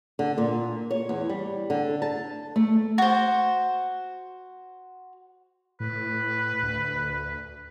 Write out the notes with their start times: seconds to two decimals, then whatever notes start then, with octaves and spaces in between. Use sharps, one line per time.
0.19 D3
0.38 A#2
0.91 C#5
1.09 E2
1.29 G3
1.70 D3
2.02 A5
2.56 A3
2.98 F#4 C5
5.80 A2 B4
6.63 D2